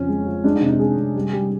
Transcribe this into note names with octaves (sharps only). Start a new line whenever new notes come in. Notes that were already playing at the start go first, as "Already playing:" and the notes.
Already playing: F2 C#3 C#4
G#3
F3
G#3 D4
D#4
C3
D#4
G#3 G#4
C3
G3
G3